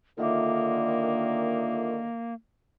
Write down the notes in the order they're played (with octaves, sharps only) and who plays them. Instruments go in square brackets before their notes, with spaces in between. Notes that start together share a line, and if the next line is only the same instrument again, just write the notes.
[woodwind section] D3 D#3 [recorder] A#3 [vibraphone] F4 E5 D6